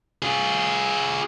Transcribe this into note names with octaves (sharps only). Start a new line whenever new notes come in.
F4 G#4